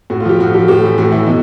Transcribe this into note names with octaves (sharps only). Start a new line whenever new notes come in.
A2 F#4
F4
F3 G4
A2 F#4
F3 G4
A2 G4
E3
A2 F#4
E3 E4
B2 D#4